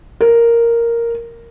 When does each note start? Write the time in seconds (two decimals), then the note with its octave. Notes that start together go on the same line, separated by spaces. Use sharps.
0.21 A#4